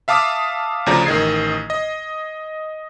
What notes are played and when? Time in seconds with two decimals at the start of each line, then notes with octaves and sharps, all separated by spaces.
0.08 E5 F5 A5 D6 D#6 F6
0.86 D2 C#3 F3 D5 A#5
1.06 A1 D#3 D#5 G#6 C7
1.70 D#5